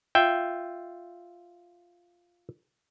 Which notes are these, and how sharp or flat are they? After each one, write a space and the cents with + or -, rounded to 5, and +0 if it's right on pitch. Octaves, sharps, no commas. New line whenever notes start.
F4 +0 E5 +0 G5 +0